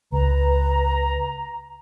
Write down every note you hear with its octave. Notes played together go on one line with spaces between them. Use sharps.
C#2 B4 A#5